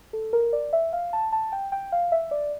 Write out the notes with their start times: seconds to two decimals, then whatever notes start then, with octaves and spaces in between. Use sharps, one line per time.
0.13 A4
0.33 A#4
0.53 D5
0.73 E5
0.93 F5
1.13 A5
1.32 A5
1.52 G5
1.72 G5
1.92 F5
2.12 E5
2.31 D5